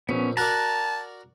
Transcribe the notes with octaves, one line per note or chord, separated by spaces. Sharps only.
A#1 B3 C#4
F#4 A#4 D5 A5 A#5 F#6